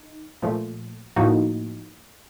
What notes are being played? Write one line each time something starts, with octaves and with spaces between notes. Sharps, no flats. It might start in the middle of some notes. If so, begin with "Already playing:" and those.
Already playing: D#4
A#2 F3 A3
A2 F3 A#3 D#4 F#4